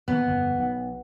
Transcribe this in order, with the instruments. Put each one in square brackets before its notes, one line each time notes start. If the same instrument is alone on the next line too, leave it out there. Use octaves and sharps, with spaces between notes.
[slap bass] A#2 D#3 F#3 [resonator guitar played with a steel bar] B3
[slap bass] G1 F2
B1